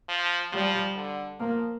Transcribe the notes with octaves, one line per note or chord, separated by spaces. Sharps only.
F3
F3 G3
D3
F3 A#3